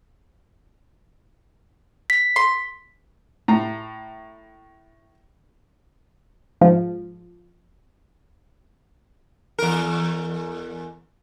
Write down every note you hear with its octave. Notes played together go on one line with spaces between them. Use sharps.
B6
C6
A2 A#5
G#2 F3
E2 A#4